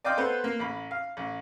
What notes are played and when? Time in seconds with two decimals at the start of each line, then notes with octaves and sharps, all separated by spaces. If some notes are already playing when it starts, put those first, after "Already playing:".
0.04 D5 D#5 F5 G5 C6 D6
0.17 B3 A4 B4 C5
0.44 A#3
0.59 A1 B5
0.91 F5
1.17 A1